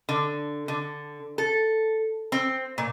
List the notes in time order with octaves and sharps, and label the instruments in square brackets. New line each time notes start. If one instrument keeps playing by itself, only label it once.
[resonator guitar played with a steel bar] D3
D3
A4
C4
A#2